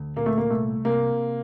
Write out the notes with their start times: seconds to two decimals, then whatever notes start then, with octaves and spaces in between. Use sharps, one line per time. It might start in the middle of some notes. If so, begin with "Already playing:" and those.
Already playing: D2
0.16 A#2 A#3
0.26 A3
0.37 A#3
0.50 C2 A3
0.85 C3 A#3